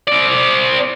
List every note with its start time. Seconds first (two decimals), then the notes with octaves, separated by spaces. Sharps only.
0.07 C4 D5